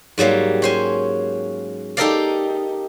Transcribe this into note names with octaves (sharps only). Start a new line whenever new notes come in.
G#2 F#3 G3 A#3
C#4 C5 G#5
D#4 G4 A4 A#4 D5 F5